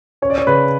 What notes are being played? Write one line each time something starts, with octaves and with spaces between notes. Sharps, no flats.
C#4 C#5
D5
C#5
C#3 B4